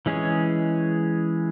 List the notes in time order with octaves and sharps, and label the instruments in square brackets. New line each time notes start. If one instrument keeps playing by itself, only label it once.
[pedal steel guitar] E3 G#3 C#4 G#4 C#5